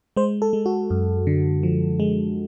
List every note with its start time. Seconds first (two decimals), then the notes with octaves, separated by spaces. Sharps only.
0.17 G#3 C5
0.42 A4
0.53 G#3
0.66 F#4
0.90 F#2
1.27 D3
1.63 F3
2.00 G#3